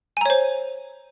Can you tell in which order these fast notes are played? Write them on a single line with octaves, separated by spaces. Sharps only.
G#5 A#5 C#5 C5